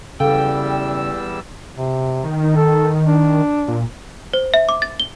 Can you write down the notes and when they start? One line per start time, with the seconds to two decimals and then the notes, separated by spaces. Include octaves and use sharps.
0.20 E2 C#3 G3 A4 F5 G5 E6
1.75 C3
2.24 D#3
2.42 D#4
2.56 A4
3.05 D4
3.68 A#2
4.33 C5
4.54 E5
4.69 D6
4.82 A6
5.00 G7